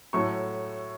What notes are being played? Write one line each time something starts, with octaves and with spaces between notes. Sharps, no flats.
A2 F#3 A3 C#6